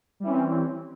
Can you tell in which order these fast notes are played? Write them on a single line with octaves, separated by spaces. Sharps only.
G3 E3 C#4 C4